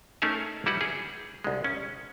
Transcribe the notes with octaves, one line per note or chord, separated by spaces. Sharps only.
A3 C#4 D#4 G#4 A#4 E5
G3 E4 F#4 B4 F#5
G#4
C2 G#3
C#4